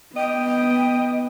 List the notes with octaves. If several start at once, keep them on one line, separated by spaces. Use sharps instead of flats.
B3 D#5 G5